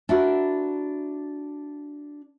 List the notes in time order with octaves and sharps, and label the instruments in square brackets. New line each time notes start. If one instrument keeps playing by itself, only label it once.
[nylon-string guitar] D4 E4 F#4 A#4